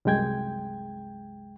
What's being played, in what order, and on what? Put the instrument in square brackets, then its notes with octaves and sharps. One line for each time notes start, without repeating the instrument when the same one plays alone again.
[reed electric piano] C2 F#2 G#3 G5 G#6